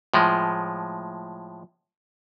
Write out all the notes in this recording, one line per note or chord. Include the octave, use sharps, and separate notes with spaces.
A2 F3 G#3